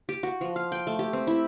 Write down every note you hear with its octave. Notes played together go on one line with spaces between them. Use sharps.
G4
F#4
F3
F5
G5
A3
G4
C4
E4